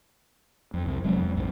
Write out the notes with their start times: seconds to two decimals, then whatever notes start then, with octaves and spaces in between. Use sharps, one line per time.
0.74 F2
0.86 C2
1.04 F#1 F#3 G#3 C#4
1.17 F2
1.35 A#1 G2